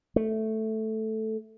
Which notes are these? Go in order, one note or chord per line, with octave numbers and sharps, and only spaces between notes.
A3